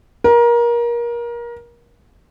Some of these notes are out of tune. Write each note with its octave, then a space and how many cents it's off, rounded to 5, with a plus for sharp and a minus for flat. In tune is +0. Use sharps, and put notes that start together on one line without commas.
A#4 +25